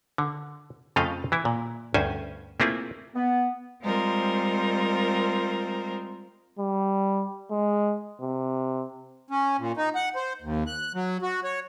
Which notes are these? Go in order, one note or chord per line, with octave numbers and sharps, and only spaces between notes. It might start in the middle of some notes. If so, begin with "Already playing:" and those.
D3
F2 C#3 F3 A3 D#5 F5
E3 E4
A#2
D2 G2 C#4 C5 G#5
A3 A#3 C4 E4 F4 G#4
B3
G3 G#3 C4 F4 A#4 C5
G3
G#3
C3
C#4
A#2
D#4
F#5
C5
D#2
F#6
F#3
F#4
C#5